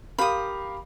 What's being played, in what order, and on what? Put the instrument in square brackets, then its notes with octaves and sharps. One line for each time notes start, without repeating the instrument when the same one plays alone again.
[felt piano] G4 A#4 F5 [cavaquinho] B5 D#6